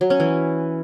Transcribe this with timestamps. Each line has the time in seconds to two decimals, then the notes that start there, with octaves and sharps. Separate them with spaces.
0.01 F#3
0.10 C#4
0.20 E3